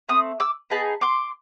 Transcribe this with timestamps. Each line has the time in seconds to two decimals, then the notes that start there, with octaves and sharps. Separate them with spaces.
0.09 A3 C4 D#6
0.40 D6 E6
0.70 B3 D#4 G#4 A5 B5
1.01 C6 D6